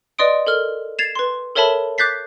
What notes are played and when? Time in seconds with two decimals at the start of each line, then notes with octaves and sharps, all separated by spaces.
0.18 B4 D5 D#5 C6 D#6 D7
0.47 A4 A#4 F6
0.99 G#6 A6 C7 E7 F7
1.15 B4 C6
1.55 A4 A#4 C#5 E5 A5 B5
1.98 D6 F#6 G6 A6 B6 C7